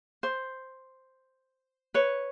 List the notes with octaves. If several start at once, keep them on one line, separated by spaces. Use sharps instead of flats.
C5
B4 C#5